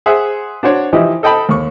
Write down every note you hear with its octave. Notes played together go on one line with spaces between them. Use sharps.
G#4 C5 E5 F#5
D4 F#4 C5 C#5
E3 F3 D#4 E4 G4 D#5
A4 D#5 G5 A5 B5
D#2 C#6